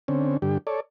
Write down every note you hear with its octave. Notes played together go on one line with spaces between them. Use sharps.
D3 C4 C#4
G2 D3 G4
A4 C#5 D5